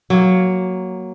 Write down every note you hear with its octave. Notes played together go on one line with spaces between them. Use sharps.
F#3 A#3